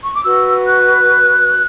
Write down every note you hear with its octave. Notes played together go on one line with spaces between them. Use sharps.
C#6
D6
F#4 B4 E6
F#6